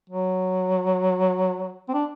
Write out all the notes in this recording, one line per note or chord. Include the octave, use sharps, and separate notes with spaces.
F#3
C4
D4